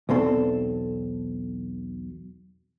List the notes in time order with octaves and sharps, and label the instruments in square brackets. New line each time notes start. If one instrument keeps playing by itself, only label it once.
[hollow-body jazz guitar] B1 E2 C4 A4